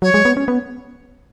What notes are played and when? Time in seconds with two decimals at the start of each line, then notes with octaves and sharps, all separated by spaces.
0.02 F#3 C#5
0.14 G#3
0.25 B3
0.37 C#4
0.48 B3